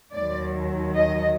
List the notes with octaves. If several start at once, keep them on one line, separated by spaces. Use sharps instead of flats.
D#2 D#3 F#3 D5
D#5